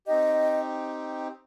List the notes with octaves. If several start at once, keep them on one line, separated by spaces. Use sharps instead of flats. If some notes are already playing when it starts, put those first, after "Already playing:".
C4 D#4 G4 D#5